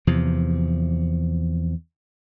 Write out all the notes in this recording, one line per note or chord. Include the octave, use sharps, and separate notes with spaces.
E2 C3 F3